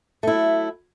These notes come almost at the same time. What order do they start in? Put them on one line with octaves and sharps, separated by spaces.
A3 E4 F#3